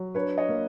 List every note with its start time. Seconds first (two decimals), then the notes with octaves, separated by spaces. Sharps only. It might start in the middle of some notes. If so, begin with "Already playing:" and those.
Already playing: F#3
0.15 D4 B4 C#5
0.38 C#5 D#5
0.49 A#3